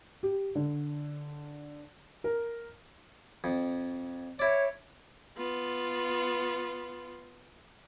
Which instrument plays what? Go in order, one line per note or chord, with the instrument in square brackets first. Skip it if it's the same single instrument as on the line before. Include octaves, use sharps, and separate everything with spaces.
[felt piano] G4
D3
A#4
[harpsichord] F2
[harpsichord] E4 D5 [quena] C#5
[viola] B3 F4